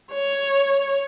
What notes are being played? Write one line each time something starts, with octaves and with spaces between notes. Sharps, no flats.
C#5